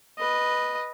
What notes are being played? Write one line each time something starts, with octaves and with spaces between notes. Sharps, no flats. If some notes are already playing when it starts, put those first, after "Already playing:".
B4 D#5